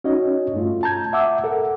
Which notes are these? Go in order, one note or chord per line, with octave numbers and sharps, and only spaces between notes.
C#4 D#4 F#4 C#5 D#5
G2 A3 F4
A5 A#5 G6 G#6
E5 F#5 D6 E6
A4 A#4 F#5